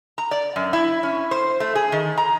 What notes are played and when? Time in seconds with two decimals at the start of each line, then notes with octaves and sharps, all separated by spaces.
0.18 A#5
0.31 D5
0.56 F#2
0.73 E4
1.03 C#4
1.31 C5
1.60 A3
1.75 G#4
1.92 D#3
2.18 A#5